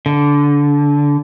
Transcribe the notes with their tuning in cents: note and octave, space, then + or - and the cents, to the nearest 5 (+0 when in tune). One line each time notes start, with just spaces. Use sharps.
D3 -20